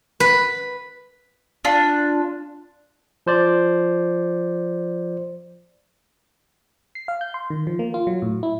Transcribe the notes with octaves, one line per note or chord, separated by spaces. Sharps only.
B4
D4 F4
F3 C5 D5
C7
F5
G6
C6
D#3
F3
A#3
F4
F#3
A2
E4